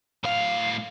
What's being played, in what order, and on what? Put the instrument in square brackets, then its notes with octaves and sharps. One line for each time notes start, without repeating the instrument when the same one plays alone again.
[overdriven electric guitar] A2 F5